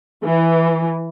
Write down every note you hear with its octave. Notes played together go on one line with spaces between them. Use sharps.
E3